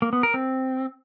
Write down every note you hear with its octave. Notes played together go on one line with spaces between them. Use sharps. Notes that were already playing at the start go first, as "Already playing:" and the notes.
A#3
B3
A#4
C4